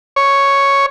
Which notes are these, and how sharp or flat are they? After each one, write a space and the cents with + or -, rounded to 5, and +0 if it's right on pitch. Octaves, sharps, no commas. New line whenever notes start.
C#5 +0